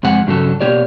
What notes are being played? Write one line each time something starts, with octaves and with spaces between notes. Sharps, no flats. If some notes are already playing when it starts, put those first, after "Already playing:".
F2 C3 G#3 F#5 G#5
G2 C#3 F#3 C#4 F#4 A4
B2 A#3 G4 C#5 D5